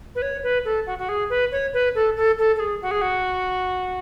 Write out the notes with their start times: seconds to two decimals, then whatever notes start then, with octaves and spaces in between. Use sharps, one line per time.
0.15 B4
0.22 C#5
0.43 B4
0.64 A4
0.86 F#4
0.98 F#4
1.08 G#4
1.29 B4
1.51 C#5
1.73 B4
1.95 A4
2.16 A4
2.38 A4
2.55 A4
2.59 G#4
2.81 F#4
2.91 G#4
3.01 F#4